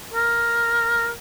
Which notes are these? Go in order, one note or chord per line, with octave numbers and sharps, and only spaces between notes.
A#4